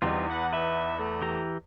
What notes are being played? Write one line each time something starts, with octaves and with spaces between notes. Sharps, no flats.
E2 G#2 B2 G3 C4 D#4 F4
B4 F#5
B3 D#4 B4 E5
A3
E3 G4 A#5